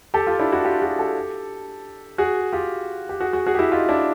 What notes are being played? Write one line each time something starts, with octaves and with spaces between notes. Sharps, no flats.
G4 A4
F4 G4
D4 E4
E4 F#4
F4 G4
F#4 G#4
G4 A4
F#4 G#4
F4 G4
G4
F#4 G#4
F#4 G#4
F#4 G#4
G4
E4 F#4
D#4 F4
D4 E4